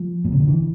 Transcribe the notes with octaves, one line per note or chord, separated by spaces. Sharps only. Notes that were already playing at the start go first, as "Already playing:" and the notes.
Already playing: F3
A#2
C#3
D3
E3